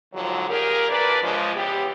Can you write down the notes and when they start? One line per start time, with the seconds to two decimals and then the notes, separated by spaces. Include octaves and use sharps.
0.13 D#2 G#2 D3 F3 F#3
0.47 A#2 G4 G#4 A#4
0.89 D2 E3 D4 B4 D5
1.21 C#3 F3 G#3
1.54 C#3 E3 B3 G4